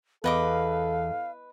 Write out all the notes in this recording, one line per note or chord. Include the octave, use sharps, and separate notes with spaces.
E2 A4 B4 D#5 F5 D6